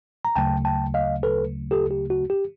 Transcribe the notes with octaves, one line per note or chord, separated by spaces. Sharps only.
A#5
D2 C#3 F#3 A3 G5 A5
G5 A5
D#5 F5
A4 B4
G4 A4
G4
F#4
G4